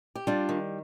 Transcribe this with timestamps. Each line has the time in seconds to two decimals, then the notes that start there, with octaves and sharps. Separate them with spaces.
0.15 G4
0.27 G3 D4 F4
0.49 D#3